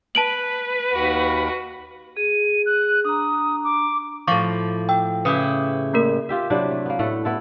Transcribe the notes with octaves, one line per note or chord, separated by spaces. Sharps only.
B4 A5 D7 F#7
D#2 F#4 B5
G#4 D#7
F#6
D4 A#5 D#6
D6
A2 F3 F5 C#6 D6
G5 E6
C#3 E4 G4 B4 D#6
A3 A#3 A#4
F4 G4 E5
C3 F#3 D4 E4
A3
A#3 B3
A2 A3 A4 F#5
B3 E4 A4